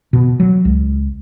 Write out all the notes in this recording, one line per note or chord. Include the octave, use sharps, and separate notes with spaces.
B2
F#3
C#2